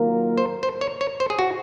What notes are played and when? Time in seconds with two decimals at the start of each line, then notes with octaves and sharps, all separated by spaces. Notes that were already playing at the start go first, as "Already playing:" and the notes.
Already playing: D#3 F#3 A#3 F4 A#4
0.38 C5
0.63 C5
0.81 C#5
1.01 C#5
1.20 C5
1.30 G#4
1.39 F#4